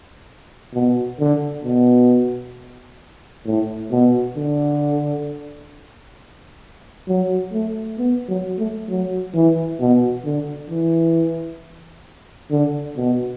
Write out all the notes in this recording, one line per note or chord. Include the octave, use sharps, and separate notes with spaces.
B2
D3
B2
A2
B2
D3
F#3
A3
B3
F#3
A3
F#3
E3
B2
D3
E3
D3
B2